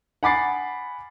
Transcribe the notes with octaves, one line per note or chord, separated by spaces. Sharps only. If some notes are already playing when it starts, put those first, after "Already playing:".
F#5 G#5 B5 D6 A6 C7